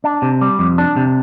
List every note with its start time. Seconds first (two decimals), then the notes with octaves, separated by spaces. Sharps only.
0.04 D4
0.22 C3
0.41 G3
0.59 F2
0.78 D4
0.97 C3